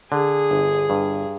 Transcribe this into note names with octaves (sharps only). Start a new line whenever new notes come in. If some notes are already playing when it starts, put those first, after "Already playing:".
D3 G#4
G1
G2